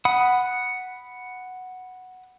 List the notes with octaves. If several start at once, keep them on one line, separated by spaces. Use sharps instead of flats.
F#5 B5 D#6